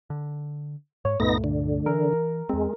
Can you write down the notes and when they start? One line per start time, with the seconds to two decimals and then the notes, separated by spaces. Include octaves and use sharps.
0.10 D3
1.05 G#2 C#5
1.20 C#2 G2 A#2 A3 B3 D#4 A#6
1.44 D3
1.86 E3 A#4
2.49 E2 G#3 C4